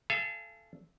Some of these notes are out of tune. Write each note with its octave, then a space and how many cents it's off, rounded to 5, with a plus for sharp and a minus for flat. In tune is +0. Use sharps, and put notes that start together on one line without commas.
A4 -10 F5 -40 G#5 +0